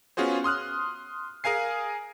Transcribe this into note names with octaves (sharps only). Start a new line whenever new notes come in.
B3 C#4 F4 F#4 G#4 C5
C6 D#6 F6 F#6
G#4 A#4 F5 G#5 C7